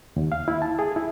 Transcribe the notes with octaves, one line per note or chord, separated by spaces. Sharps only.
D#2
F5
E4
A5
G#4
E4